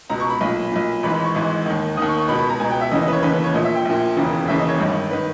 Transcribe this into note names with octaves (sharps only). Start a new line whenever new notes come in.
C#2 B2 A#5
C#6
B5
B1 A#2
B1 A#2
G#1 G#2 E3 B5
B5
C#6
G#1 G#2 E3
D#2 D#3
D#2 D#3 D#6
C#6
C#6
C#2 B2 B5
B5
A#5
C#2 B2 G#5
G5
E5
D#2 C#3 E3 D#5
D#5
B4
C#5
D#2 C#3 E3 B4
B4
C#5
A#1 A#2 D#5
E5
G5
A#1 A#2
E1 D#2 C#3 E3
E1 D#2 C#3 E3 E5
D#5
C#5
G#1 G2 D#3
D#3 B4